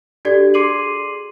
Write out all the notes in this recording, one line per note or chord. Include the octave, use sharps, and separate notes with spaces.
D4 F#4 G4 A4 D5 G#6
G#4 C6 D6 C7 D#7 F#7